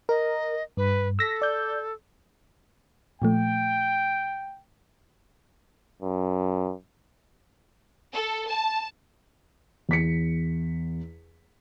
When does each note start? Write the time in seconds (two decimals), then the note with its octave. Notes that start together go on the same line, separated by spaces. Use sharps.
0.09 A#4 D#5
0.77 G2 B4
1.19 A4 E6 A#6 B6
1.42 D5 G6
3.22 A#2 F3 A3 G5
6.02 F#2
8.13 A4
8.47 A5
9.89 E2 B6 C#7